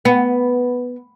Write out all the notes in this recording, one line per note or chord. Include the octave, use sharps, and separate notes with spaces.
B3